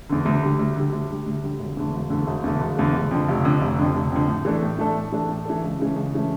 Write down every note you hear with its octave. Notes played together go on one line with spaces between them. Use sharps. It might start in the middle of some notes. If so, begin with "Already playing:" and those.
E2 D3
D2
D3 G3
D2
D3 G3
D2
D3 G3
D2
D3 G3
E1
E2 D3 A3
E1
E2 D3 A3
E1
E2 D3 A3
E1
E2 D3 A3
F1
F2 D3
F1
F2 D3
F1
F2 D3
F1
F2 D3
A2
E3 A3 D4 A4
A2
E3 A3 D4 A4
A2
E3 A3 D4 A4
A2
E3 A3 D4 A4
C#2
C#3 E3 A3
C#2
C#3 E3 A3